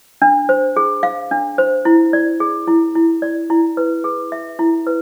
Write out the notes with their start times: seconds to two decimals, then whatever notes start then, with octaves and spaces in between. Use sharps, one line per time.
0.22 D4
0.49 C5
0.76 G#4
1.03 F5
1.31 D4
1.58 C5
1.85 E4
2.13 D5
2.40 G#4
2.68 E4
2.95 E4
3.22 D5
3.50 E4
3.77 B4
4.04 G#4
4.32 E5
4.59 E4
4.87 B4